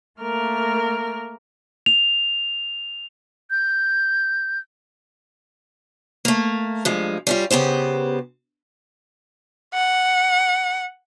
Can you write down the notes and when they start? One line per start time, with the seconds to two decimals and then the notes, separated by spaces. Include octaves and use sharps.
0.21 A3 A#3 A#4 F6
1.86 F7
3.50 G6
6.25 A3 A#3
6.85 G2 F3 G#3
7.27 G3 C#4 F4
7.50 C#3 B3 G4 C5
9.74 F#5